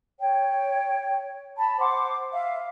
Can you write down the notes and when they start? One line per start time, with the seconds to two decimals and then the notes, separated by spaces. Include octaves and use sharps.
0.19 C#5 G5
1.57 A5 B5
1.79 C5 F#5 C6 D6
2.32 E5 F5